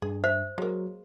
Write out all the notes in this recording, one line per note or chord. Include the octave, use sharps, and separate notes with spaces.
G2 G#4
C5 E5
F#3 G#3 A#3